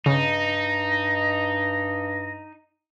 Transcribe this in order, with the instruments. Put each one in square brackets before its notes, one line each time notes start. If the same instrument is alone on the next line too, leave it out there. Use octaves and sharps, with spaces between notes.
[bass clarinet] G2 [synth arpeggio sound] C#3 [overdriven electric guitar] D#4 [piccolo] A#6